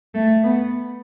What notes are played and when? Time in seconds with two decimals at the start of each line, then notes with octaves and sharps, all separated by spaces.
0.15 A3
0.44 B3